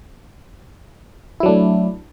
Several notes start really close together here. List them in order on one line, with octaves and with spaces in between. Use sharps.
E4 F#3 D4 A3